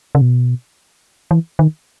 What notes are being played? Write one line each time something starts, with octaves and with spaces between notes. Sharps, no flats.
C#3
B2
E3
D#3